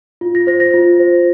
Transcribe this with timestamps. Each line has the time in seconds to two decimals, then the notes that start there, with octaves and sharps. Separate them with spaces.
0.21 F4
0.35 A#6
0.47 C5 A#6
0.60 A#6
0.74 F4
0.99 C5